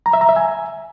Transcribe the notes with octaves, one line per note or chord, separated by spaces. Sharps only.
A#5
E5
A#5
E5
G#5